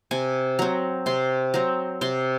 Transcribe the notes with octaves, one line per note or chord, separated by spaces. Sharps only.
C3 G#5
F#3 C4 A#5
C3 C6
F#3 C4 A#5
C3 C6